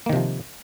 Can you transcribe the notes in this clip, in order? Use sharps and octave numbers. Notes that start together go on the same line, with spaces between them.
C3 D#3 F3 A#3